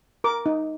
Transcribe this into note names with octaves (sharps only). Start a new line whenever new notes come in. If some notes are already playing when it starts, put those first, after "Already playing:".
A#4 D6
D#4